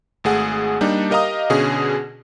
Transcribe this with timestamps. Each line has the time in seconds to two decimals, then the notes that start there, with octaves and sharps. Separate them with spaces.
0.24 G#1 A3 G#4 F#5
0.81 G3 A#3 D4 D#4
1.10 G4 A#4 D#5 F5 A#5 D#6
1.50 B2 D3 C#4 G#4